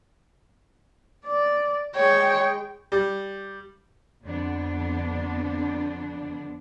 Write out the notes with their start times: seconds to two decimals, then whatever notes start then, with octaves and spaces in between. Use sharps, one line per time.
1.26 D5
1.96 G#3 C#5 G5
2.92 G3
4.23 F2 D3 B3 D4